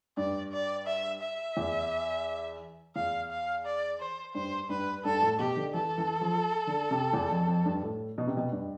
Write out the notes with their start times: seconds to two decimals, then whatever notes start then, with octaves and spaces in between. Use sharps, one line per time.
0.17 G2 D5
0.52 D5
0.87 E5
1.22 E5
1.57 E2
2.96 E2 F5
3.31 F5
3.66 D5
4.00 C5
4.34 G2 C5
4.70 G2 B4
5.04 G2 A4
5.22 A2
5.39 B2 G4
5.57 D3
5.74 E3 A4
5.98 E3
6.21 F3
6.67 D3
6.91 C3
7.13 E2
7.31 F2
7.48 F2
7.65 G2
7.83 A2
8.18 B2
8.27 C3
8.37 B2
8.52 G2